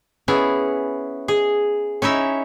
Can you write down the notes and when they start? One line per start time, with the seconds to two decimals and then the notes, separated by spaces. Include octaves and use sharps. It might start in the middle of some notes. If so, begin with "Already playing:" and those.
0.28 B3 C#4 E4 G#4
1.28 G#4
2.02 C#4 D#4 E4 E5